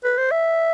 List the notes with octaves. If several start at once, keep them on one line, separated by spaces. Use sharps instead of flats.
B4
C5
E5